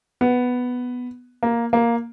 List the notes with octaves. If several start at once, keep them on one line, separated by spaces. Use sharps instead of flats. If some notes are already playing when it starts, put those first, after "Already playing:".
B3
A#3
A#3